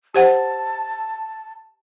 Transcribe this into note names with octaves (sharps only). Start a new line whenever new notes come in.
G4 C5 F#5 A5